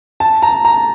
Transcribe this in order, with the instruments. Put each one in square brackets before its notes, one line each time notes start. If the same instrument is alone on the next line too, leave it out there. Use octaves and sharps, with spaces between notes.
[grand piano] A5
A#5
A#5